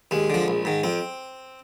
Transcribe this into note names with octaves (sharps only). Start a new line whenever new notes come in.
D#2 G#3
D3 F3
A#1
G#2 D#3
F2 C4